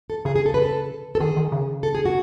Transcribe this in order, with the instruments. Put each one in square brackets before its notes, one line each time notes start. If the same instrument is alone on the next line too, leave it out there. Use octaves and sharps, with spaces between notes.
[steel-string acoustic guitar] A4
[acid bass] C#3 [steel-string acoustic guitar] G#4
[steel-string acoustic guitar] G#4
A4
B4
A4
A4
[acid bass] D#3 [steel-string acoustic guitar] G#4
[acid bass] D#3
C#3
[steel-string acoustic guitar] A4
G#4
F#4